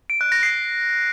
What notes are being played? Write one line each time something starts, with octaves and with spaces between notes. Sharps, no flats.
D7
F#6
A#6
C7